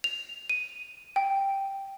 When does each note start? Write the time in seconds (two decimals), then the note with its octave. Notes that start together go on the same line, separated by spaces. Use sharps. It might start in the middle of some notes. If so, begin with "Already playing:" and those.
0.04 F7
0.49 D#7
1.16 G5